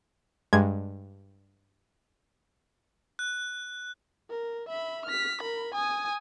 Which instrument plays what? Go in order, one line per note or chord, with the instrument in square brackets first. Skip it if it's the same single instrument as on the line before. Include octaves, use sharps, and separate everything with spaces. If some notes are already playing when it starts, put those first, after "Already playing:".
[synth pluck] G2 G#3 G#6
[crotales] F#6
[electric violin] A#4
E5 B5
F6 B6
A#4 B5
G#5 D#6